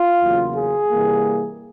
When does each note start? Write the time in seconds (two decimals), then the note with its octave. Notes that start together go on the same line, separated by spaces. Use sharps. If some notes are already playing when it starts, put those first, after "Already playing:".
Already playing: F4
0.21 E2 C#3 F#3 A#3
0.56 G#4
0.91 C3 E3 G3 A#3